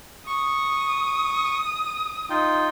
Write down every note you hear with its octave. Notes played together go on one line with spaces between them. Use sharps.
C#6 D#6
D#4 F4 G5